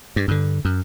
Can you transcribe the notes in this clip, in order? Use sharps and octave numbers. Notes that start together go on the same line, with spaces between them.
G2
G2 D3
F#2